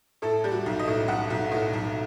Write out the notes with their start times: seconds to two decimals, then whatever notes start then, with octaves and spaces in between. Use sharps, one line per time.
0.22 A2 A4
0.44 G3
0.52 F#4
0.66 B1
0.79 D#5
0.88 A2
1.08 B1 F#5
1.30 B1
1.51 A2
1.73 B1